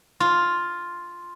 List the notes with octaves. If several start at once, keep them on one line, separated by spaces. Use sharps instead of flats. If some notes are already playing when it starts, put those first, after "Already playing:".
F4